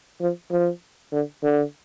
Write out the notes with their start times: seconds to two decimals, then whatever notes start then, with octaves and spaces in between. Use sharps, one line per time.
0.21 F3
0.51 F3
1.12 D3
1.43 D3